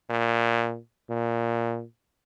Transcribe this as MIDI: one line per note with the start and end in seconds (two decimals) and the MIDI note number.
0.10 0.79 46
1.10 1.84 46